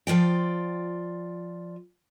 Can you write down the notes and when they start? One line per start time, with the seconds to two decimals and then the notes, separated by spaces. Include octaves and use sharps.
0.07 F3 F4 D5 G5